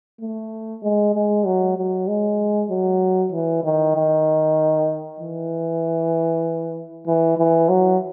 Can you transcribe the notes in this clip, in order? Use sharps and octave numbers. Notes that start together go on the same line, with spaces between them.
A3
G#3
G#3
F#3
F#3
G#3
F#3
E3
D#3
D#3
E3
E3
E3
F#3